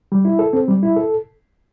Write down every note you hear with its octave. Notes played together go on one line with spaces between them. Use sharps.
G3
E4
A4
C4
G3
E4
A4